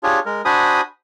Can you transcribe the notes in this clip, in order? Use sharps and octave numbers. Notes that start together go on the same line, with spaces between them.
D4 F4 G4 G#4 C#5
G#3 A#4
D4 F#4 C5 G#5 B5 D#6